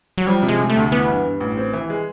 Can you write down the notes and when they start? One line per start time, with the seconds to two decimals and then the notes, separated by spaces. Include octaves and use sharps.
0.18 F#3
0.27 F3 G3
0.42 C3
0.48 G#3
0.59 C3
0.70 A3
0.76 D2
0.92 E3 B3
1.08 G2
1.25 G2
1.40 A1
1.57 C4
1.73 E3
1.90 G#3